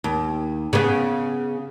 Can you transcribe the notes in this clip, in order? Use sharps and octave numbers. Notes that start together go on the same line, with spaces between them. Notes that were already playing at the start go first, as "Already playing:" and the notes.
D#2
C#3 B3